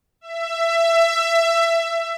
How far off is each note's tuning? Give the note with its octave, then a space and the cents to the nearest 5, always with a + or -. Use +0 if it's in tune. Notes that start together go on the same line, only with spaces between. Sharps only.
E5 +20